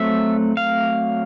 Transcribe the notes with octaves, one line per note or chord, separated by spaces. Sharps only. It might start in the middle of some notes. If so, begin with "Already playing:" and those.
Already playing: F#3 A3 C4 E5
F5